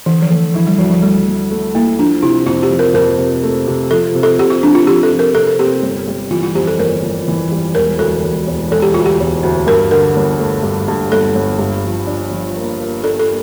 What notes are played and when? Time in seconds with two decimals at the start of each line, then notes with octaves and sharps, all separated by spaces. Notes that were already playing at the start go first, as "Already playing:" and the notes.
0.06 D3 E3
0.22 F3
0.30 A3
0.54 F3 E4
0.67 G3
0.78 D2 F3
0.91 F3
1.02 G3 A3
1.27 A3
1.51 A3
1.74 A#3 E4
1.99 F3 D4
2.23 C3 E4
2.46 F2 F4
2.63 G4
2.70 F3
2.79 A#4
2.94 F2 A#4
3.18 C3
3.43 A3
3.67 C3
3.91 F3 A4
4.15 C3
4.23 A4
4.38 C3 G4
4.50 F4
4.63 F3 D4
4.75 F4
4.87 F3 G4
5.03 A4
5.12 F3
5.19 A#4
5.35 C3 A4
5.47 A4
5.59 C4 G4
5.82 G1
6.08 G3
6.31 E3 F4
6.43 F4
6.55 F2 G4
6.67 A4
6.79 G1 A#4
7.03 F2
7.28 E3
7.51 G3
7.75 E1 A#4
7.99 D2 A4
8.24 E1
8.47 E1
8.71 E1 A4
8.82 G4
8.94 D2 F4
9.06 G4
9.20 E1
9.43 D2
9.67 G2 A#4
9.91 D3 A#4
10.16 G1
10.39 A3
10.63 G2
10.88 G2
11.12 G1 A4
11.35 G1
11.59 G2
11.84 F3
12.07 D4
12.31 F3
12.56 A#3
12.80 A#3
13.04 D4 A4
13.19 A4
13.28 A#3